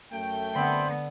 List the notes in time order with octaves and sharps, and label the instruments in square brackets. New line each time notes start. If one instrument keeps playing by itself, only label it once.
[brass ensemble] F#2 A3 G5
[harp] D3 [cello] B3 [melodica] C4 C5 B5